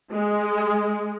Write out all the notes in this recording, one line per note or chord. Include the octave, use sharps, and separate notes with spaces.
G#3